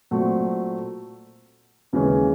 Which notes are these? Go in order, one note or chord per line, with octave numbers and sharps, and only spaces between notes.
A#2 F#3 A3 C4
D#2 C#3 E3 G#3 C#4